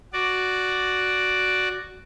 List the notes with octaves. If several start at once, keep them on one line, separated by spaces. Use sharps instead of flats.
F#4 D5